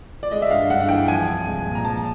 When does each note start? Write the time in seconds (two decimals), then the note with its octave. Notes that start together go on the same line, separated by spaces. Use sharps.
0.23 D5
0.31 G#3 D#5
0.42 E5
0.50 G2 F5
0.70 G2 F#5
0.80 F#5
0.89 E3 G5
1.08 F3 G#5
1.28 C2
1.47 G#3
1.66 A#2
1.75 A#5
1.84 F3 A5